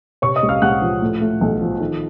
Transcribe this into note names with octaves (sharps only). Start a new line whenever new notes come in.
C3 C#5 C#6
D#5 D#6
C#2
F5 F6
C#2 F#5 F#6
F3
A2
A3
B1
F3
D#3